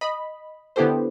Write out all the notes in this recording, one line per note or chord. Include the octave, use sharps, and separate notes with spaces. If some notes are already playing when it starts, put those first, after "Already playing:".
D#5 B5
D3 B3 E4 G4 A4 C5